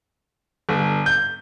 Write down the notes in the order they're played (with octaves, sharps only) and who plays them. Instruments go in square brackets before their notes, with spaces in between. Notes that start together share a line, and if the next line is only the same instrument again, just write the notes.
[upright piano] G1
G6